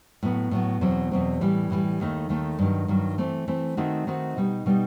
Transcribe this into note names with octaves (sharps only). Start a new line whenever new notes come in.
A2 F#3 B3
A2 F#3 B3
E2 B2 F#3 C4
E2 B2 F#3 C4
A2 E3 G3
A2 E3 G3
D#2 D#3 A3 D#4
D#2 D#3 A3 D#4
G2 D#3 F#3
G2 D#3 F#3
E3 A3 C4
E3 A3 C4
D#3 A3 C4 D#4 F#4
D#3 A3 C4 D#4 F#4
B2 G3 D#4
B2 G3 D#4